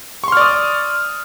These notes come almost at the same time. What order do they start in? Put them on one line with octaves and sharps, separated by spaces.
C#6 C6 F6 D5 D#6